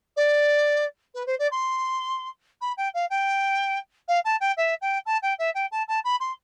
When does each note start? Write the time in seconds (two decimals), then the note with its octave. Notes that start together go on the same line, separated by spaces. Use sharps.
0.17 D5
1.15 B4
1.27 C5
1.39 D5
1.51 C6
2.61 B5
2.77 G5
2.94 F5
3.10 G5
4.08 F5
4.25 A5
4.41 G5
4.57 E5
4.82 G5
5.06 A5
5.22 G5
5.39 E5
5.55 G5
5.72 A5
5.88 A5
6.04 B5
6.20 C6